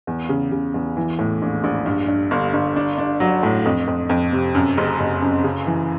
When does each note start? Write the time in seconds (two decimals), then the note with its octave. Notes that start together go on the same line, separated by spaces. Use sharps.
0.07 E2
0.29 C#3
0.52 C#3
0.74 E2
0.97 E3
1.19 A2
1.42 A#1
1.64 A#1
1.86 G2
2.08 G2
2.31 G1
2.53 G1
2.76 D4
2.98 D4
3.20 F#3
3.43 A2
3.65 F2
3.88 F2
4.10 F2
4.32 C3
4.55 F#2
4.77 F#1
5.00 F#1
5.22 F#2
5.44 C#3
5.67 E3